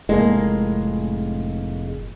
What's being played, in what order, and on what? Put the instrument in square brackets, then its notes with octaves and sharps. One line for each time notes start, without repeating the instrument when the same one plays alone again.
[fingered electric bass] F1 A2 [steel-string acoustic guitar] G#3 A#3